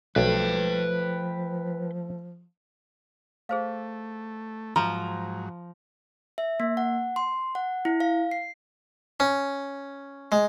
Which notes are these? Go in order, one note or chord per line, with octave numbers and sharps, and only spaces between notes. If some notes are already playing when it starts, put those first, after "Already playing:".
B1 F3 A3 B4 G5
A3 G#4 C5 F5
G#2 F3 F#3 A#5
E5
A#3
F#5
C6
F#5
E4
F5
C7
C#4
G#3